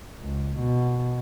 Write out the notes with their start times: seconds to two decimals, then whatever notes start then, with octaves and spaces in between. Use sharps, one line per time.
0.20 C#2
0.59 B2